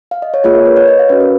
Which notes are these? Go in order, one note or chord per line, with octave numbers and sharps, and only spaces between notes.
F5
D#5
C#5
A#3 F4 G#4 C#5
A#4
B4
C#5
D#5
F5
C#4 F#4 B4
A#4